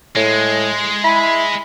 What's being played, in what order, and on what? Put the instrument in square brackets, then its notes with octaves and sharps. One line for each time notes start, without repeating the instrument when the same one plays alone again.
[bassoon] A2 [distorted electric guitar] G#3
[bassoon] E4 [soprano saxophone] B5